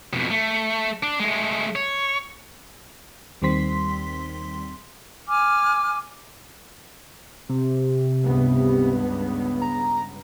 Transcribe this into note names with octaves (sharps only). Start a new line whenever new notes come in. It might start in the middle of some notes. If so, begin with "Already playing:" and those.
F2 B2
A3
D4
G#3 A3
C#5
D#2 D#3 G3 C4 C6 B6
G#5 D6 F6
C3
C#2 G2 B3
A#5